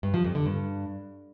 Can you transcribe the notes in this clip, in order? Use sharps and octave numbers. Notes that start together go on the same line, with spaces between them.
G2
F3
F2
D3
G2